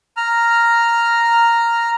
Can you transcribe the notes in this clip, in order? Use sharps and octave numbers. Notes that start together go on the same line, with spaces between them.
A#5 F6